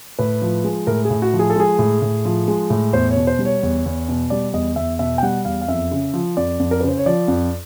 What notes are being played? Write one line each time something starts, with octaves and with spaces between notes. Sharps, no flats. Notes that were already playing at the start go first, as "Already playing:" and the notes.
A2 B4
F3
G#3
A2 A#4
G#4
A2
F#4
F3
G#4
A4
G#3 G#4
A2
A2
F3
G#3
A2
E2 C5
C#5
B2
C5
G3
C#5
E2
E2
B2
G3 D5
E2 D#5
E2 E5
B2 E5
G5
G3 F#5
E2 F5
F5
F2 E5
C#3
F3
F2 D5
F2
A#4
C#3 B4
C5
C#5
F3 D5
F2